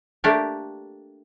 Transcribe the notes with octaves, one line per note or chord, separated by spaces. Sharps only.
A3 A#3 D4 G4